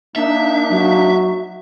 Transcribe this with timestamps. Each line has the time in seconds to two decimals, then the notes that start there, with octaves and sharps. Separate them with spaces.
0.16 A#3 D4 D#4 E5
0.70 F#3